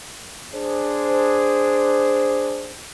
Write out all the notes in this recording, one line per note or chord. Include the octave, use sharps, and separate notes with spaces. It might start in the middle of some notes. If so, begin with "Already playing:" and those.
D4 G#4 C5